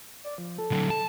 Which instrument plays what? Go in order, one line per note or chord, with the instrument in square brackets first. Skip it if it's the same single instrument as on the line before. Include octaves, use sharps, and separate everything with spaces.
[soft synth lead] D5
F3
A4
[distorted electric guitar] D3 F#3
A5